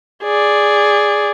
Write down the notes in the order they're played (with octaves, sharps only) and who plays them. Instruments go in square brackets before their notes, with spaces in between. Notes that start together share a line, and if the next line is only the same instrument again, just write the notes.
[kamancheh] G#4 D5